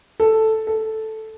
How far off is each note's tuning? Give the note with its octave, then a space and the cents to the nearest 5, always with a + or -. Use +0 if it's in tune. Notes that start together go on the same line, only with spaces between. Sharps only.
A4 +0
A4 -5